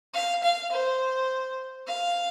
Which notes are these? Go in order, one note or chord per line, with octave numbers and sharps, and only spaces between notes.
F5
F5
C5
F5